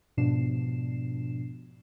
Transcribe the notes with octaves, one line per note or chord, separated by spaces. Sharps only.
G#2 B2 F3 D4 C7 E7